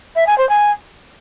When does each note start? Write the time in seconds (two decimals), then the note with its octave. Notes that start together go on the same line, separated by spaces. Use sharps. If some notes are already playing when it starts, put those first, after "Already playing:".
0.15 E5
0.26 G#5
0.38 C5
0.49 G#5